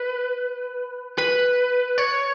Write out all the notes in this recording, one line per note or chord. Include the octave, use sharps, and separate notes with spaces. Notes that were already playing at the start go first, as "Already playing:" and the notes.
Already playing: B4
B4
C#5